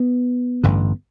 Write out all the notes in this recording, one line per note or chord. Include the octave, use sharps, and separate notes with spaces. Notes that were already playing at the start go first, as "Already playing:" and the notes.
Already playing: B3
A1 G2 D3